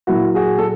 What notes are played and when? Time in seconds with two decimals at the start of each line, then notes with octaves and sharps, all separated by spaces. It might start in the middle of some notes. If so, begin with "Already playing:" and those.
0.07 A#2 F#3 E4 F#4
0.35 F#4 G#4
0.58 A4